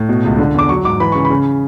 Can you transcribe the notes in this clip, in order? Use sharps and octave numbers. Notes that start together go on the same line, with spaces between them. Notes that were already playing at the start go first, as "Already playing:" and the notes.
Already playing: A2
B2
C#2
D3
E2 D6
F#3 C#6
G#2 D6
E3 B5
C#3 C#6
B5
C#3